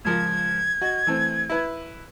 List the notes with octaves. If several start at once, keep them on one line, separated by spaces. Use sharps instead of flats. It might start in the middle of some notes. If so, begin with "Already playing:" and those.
C#2 F3 A#4 G#6
F#4 D#5
E3 A3 C4
E4 B4